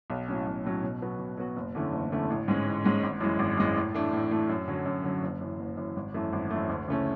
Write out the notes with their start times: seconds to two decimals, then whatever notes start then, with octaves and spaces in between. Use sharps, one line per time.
0.10 B1
0.28 A2 F#3 C#4
0.47 B1
0.64 A2 F#3 C#4
0.83 B2
1.02 F#3 B3 F#4
1.19 B2
1.37 F#3 B3 F#4
1.56 F#1
1.75 E2 D3 A3 C#4
1.92 F#1
2.12 E2 D3 A3 C#4
2.30 A1
2.48 G#2 G#3 C#4
2.66 A1
2.84 G#2 G#3 C#4
3.03 G#1
3.21 F#2 E3 G#3
3.39 G#1
3.57 F#2 E3 G#3
3.76 A2
3.94 E3 A3 D4
4.13 A2
4.31 E3 A3 D4
4.49 F#2
4.68 D3 F#3 C#4
4.85 F#2
5.04 D3 F#3 C#4
5.23 F#1
5.41 F#2 E3
5.59 F#1
5.77 F#2 E3
5.96 G#1
6.14 F#2 E3 A3
6.33 G#1
6.51 F#2 E3 A3
6.69 D2
6.88 C#3 E3 A3 C#4